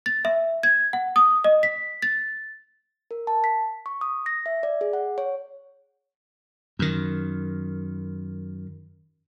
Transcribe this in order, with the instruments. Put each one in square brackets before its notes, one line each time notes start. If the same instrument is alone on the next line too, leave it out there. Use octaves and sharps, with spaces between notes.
[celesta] A6
E5
G#6
F#5
D#6
D#5
B6
A6
[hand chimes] A#4
A5
B6
C#6
D#6
A#6
E5
D5
G#4
F#5
C#5
[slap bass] F#2 D#3